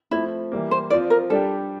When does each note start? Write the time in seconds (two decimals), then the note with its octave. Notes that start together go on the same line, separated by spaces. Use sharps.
0.11 F3 A3 C4 E4
0.52 E3 G3 A#3
0.71 C5
0.90 F3 C4 F4 D5
1.10 A#4
1.30 G3 D4 G4 A4